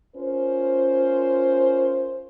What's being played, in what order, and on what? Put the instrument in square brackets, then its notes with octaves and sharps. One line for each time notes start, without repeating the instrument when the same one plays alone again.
[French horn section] C#4 F4 A#4 C5